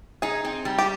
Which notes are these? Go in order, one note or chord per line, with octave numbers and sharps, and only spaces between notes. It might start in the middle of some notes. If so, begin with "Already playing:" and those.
D#4 G#4
C4
G3
G4